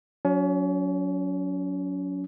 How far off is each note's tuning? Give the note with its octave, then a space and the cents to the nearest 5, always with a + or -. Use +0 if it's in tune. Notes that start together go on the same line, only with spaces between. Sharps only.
F#3 -15 C#4 +35